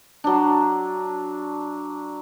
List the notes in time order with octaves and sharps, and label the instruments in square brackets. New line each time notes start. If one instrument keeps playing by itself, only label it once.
[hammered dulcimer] F#3 D4